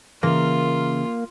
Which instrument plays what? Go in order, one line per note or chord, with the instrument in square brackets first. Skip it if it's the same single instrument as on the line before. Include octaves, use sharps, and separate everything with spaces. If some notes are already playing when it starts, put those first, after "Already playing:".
[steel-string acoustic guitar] C#3 [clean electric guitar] E3 E5 [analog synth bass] A#3 [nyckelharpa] F4